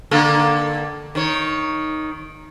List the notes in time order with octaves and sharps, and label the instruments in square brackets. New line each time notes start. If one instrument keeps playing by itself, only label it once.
[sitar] D3 A#3 A4
D#3 C#5